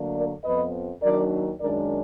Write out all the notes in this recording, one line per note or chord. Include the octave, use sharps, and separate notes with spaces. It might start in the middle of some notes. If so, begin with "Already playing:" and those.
Already playing: D2 D3 F#3 A#3 D4
A#4 D5
F2 F3 B3 B4 D#5
D#2 D#3 F#3 D4 A#4 D5
F#2 D#3 G#3 D4 A#4 D5